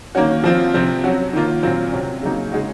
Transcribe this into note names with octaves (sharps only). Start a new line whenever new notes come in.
D#3 A#3 C#4 F#4
F3 C4 F4
C3 F3 C4
F#3 C#4 F#4
D#3 A#3 F4
A#2 F#3 C4 F4
C3 F#3 C#4
C#3 F#3 A#3 D#4 F#4
C#3 G#3 D#4 F#4